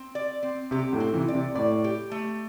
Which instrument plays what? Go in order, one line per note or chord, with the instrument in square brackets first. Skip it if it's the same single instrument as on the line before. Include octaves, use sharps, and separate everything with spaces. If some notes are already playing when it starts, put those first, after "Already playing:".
Already playing: [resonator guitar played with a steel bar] C4
D5
C4
[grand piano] C3 [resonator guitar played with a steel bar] G4
[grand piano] A2 D3
[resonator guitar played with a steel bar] C4
[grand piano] C3 E3
[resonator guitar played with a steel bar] D5
[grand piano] C3
[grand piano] A2 [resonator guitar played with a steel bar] D5
[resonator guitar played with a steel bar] G4
A3